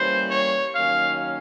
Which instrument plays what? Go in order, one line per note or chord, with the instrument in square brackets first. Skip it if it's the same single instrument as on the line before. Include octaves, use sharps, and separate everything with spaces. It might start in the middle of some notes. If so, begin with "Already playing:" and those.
Already playing: [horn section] E3 G3 A#3 C#4 C5
C#5
D#3 F#3 A#3 C#4 F5